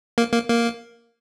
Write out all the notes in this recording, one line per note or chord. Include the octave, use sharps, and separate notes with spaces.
A#3
A#3
A#3